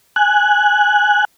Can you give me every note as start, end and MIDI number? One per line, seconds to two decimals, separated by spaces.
0.16 1.25 80
0.16 1.25 90